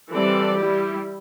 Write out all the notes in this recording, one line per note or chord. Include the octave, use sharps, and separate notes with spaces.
E3 G3 C4 A4 D5
G3 E4 G4